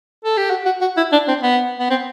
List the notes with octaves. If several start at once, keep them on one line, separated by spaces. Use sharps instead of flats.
A4
G4
F#4
F#4
F#4
E4
D4
C4
B3
B3
C4